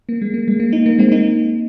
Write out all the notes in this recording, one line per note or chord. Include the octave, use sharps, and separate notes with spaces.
A#3
G#3
A#3
G#3
A#3
A#3 D#4
A#3
G#3 C4
A#3 D#4